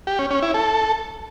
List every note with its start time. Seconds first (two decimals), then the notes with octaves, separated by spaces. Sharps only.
0.07 G4
0.19 C#4
0.31 C#4
0.42 E4
0.54 A4